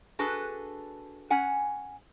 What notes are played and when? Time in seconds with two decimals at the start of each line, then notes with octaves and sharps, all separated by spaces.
0.19 D4 F#4 G#4 A4 B4
1.30 C#4 F#5 G#5